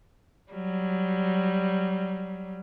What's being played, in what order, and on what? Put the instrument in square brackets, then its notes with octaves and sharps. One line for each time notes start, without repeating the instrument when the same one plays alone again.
[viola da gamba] F#3 G3